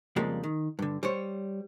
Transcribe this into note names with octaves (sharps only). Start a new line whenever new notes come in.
F2 C#3 G3 G#3 A#3
D#3
G2 D3
G3 C5 C#5